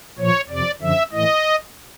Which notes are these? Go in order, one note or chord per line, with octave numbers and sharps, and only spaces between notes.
A#2 F3 C#5
F2 C3 F3 D5
F#2 D3 F3 E5
A2 E3 D#5